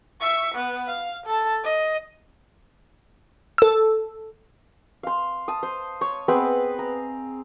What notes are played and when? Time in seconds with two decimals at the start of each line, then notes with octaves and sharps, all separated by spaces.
0.21 E5 C#6
0.55 B3
0.87 F5
1.26 A4 A5
1.64 D#5
3.58 A4 E6
5.03 F5 C6
5.48 A5 D#6
5.63 C5
6.01 C#5
6.28 B3 C4 G#4 B4
6.79 A#5